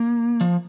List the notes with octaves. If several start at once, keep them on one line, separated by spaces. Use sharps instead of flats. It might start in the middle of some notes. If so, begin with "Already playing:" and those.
Already playing: A#3
F3